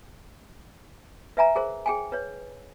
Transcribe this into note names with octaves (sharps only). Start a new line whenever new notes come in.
B4 E5 G#5 A#5
G#4 A#4 C5
G#4 G5 G#5
B4 C#5